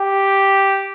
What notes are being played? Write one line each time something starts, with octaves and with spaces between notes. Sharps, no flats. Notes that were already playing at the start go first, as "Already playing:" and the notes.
Already playing: G4